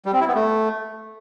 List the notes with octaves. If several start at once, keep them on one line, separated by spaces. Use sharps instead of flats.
G3
C4
E4
B3
A3